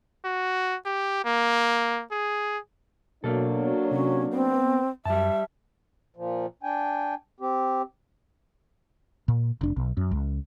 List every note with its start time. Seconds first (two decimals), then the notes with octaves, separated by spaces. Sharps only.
0.25 F#4
0.85 G4
1.24 A#3
2.11 G#4
3.24 B2 F#3 A#3 D4 A4
3.91 C3 C#4
4.33 B3 C4
5.05 F#2 G3 E5 A5
6.16 A#2 F3
6.63 D4 G5 G#5
7.40 C4 G4
9.28 A#2
9.61 F1 D4
9.76 B1
9.97 F#2
10.11 C#2